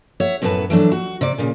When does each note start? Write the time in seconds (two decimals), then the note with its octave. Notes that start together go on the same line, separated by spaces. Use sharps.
0.20 C#5 E5 F#5
0.42 F#2 A2 A3 B3 B4 A5
0.70 E3 F#3 A3 D4
0.92 F#4
1.21 C3 D5
1.38 A#2 C#3